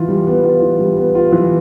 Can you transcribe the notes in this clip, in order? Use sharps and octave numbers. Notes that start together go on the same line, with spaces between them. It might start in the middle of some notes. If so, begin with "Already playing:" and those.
Already playing: E3 F4
G3
B3
F4
E3
G3
B3
F4
E3